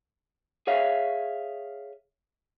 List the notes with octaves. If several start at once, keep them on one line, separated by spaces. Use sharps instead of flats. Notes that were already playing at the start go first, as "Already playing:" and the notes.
G#4 C#5 E5 F5